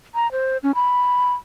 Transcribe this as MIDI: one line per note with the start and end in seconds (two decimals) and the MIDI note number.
0.15 0.31 82
0.32 0.58 72
0.63 0.72 61
0.75 1.33 83